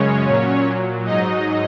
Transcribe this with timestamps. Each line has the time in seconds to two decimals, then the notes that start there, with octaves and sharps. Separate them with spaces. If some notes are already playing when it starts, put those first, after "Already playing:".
Already playing: F#2 C#3 G#3 C#4 C#5
0.27 A#2 F#3
0.66 A#2 F#3
1.05 G#2 F#3 D#4 D#5